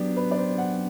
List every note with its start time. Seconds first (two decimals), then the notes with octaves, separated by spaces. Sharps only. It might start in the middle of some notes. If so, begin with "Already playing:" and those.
Already playing: F#3 B3 D4 G4 D5
0.17 B4
0.31 D5
0.37 C5
0.58 F#5